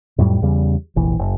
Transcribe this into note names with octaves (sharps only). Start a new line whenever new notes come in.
F2 A2 F#3 G3
E2 C#3 G3
F1 A#1 E3
F#1